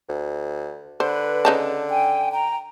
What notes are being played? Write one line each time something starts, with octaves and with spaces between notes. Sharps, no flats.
D2
D3 B4 C5
C#3 D#4 A5
G5 G#5
G5 A#5